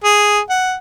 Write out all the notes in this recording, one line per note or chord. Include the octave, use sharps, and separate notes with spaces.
G#4
F#5